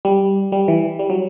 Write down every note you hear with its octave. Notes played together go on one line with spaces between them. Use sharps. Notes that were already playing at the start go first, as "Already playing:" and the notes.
G3
G3
E3
G3
F#3